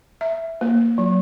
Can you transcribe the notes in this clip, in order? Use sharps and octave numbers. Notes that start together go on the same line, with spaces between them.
E5
A#3
F#3